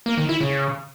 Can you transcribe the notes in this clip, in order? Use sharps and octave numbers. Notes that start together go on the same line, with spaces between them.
A#3
D#3
E4
C#3